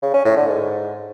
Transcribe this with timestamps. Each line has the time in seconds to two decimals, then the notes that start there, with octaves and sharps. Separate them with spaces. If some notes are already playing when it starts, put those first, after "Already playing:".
0.02 C#3
0.14 C#4
0.25 A2
0.37 D3
0.48 G#2